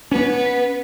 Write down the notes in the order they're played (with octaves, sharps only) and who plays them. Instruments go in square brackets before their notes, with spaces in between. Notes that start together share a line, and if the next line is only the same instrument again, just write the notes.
[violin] B3 [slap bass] C#4